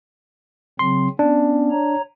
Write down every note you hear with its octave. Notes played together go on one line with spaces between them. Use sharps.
C#3 F#3 C4 C6
B3 C#4 D4
C#5 A#5